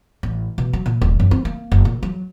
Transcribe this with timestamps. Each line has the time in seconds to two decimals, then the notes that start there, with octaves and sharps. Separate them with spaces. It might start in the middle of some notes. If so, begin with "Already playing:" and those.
0.23 A1
0.58 B2
0.73 F#3
0.86 A#2
1.02 D#1
1.20 F#2
1.31 C4
1.45 A#3
1.72 F#1
1.85 A#2
2.03 F#3